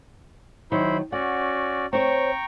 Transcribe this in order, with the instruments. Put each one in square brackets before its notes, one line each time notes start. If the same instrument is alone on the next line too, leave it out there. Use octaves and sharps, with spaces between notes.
[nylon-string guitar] D#3 F#3 [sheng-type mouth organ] E4 C5 B5
[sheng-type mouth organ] C#4 F#4 D5 [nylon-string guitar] F#5
[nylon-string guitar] C4 C#5 [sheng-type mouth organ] G5 A#5 C#6